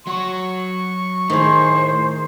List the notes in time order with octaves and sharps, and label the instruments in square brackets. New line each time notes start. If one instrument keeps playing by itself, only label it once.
[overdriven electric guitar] F#3 F#4 [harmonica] C#6
[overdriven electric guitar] A2 [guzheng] D#3 G#4 [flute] C5